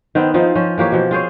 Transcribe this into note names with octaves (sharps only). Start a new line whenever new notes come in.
D#3 B3 C4
F3 C4 D#4 F4
F3 C#4
E3 A#3 G4 C#5
B2 F3
F4 G#4 C5 C#5